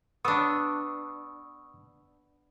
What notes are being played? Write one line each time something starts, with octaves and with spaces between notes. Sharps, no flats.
B3 D4 C#6 D#6 E6